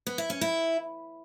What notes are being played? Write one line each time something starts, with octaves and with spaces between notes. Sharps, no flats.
B3
E4
C#4
E4